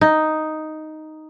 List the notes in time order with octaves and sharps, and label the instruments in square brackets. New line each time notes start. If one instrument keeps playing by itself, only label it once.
[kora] D#4